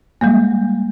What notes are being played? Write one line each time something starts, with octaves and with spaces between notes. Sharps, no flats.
G3 G#3 A#3